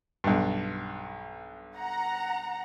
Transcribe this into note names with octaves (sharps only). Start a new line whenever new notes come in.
B1 G2
F#5 A#5